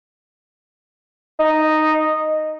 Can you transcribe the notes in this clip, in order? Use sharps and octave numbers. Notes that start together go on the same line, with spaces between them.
D#4